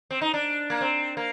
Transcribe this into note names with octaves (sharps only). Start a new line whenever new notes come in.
C4
D#4
D4
A#3
C4
A#3